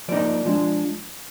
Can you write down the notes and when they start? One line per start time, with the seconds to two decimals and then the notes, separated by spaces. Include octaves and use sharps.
0.08 F3 A#3 D#4 D5
0.46 F3 G#3 D4